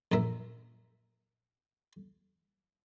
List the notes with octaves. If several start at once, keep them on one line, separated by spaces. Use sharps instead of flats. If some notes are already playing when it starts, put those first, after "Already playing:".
A#1 F#2 A#4 E5